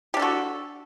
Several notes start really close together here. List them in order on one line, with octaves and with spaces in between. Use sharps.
G4 D4 A4 F#4